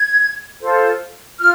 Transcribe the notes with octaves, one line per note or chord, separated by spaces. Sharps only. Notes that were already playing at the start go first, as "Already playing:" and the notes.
Already playing: G#6
F4 A4 C5
F4 F6